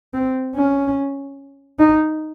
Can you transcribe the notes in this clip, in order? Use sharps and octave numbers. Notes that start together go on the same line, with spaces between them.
C4
C#4
D#4